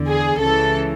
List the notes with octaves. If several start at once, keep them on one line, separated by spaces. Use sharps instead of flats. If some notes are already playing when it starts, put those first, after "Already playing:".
Already playing: E2 D3
G#4
C#2 C#3 E3 A4